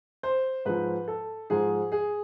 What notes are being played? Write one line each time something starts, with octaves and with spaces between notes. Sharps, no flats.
C5
G#2 F3 B4
A4
G#2 F3 G#4
G#4